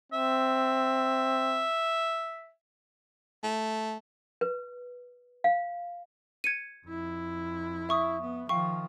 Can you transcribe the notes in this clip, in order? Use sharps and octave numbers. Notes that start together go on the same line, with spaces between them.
C4 E5
A3
B4
F5
G#6 C#7 D#7
F2 E4
E5 C#6 D#6
B3
D#3 F3 F5 G5 C#6